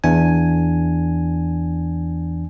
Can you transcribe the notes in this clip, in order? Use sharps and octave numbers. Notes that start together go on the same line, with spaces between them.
E2 D4 G#5